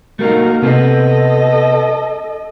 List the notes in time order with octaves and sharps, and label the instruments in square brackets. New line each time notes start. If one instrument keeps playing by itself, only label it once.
[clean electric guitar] A3 A#3 D#4 [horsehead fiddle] F#4 A#4
[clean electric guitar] C3 B3 C4 [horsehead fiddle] A4 D#5